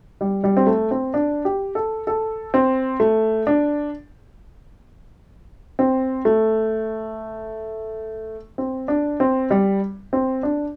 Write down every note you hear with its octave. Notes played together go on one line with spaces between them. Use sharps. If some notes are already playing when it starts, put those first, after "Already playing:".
G3
G3
C4
A3
C4
D4
G4
A4
A4
C4
A3
D4
C4
A3
C4
D4
C4
G3
C4
D4